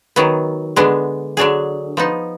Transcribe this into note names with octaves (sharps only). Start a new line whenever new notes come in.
D#3 F#3 B3
D3 G#3 B3 D4
D3 F#3 D4 G#4
F3 B3 D#4